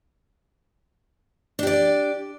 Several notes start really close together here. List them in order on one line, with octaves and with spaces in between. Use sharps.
D4 G4 D5